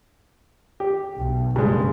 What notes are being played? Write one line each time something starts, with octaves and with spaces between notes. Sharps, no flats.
G4
B1
F#1 G2 C#3 G#3